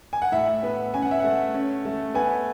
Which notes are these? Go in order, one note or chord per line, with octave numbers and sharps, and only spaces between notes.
G#5
F#5
A2 E5
B3
C#4 G#5
F#5
E5
A3 F#5
C#4
A3
B3 G#5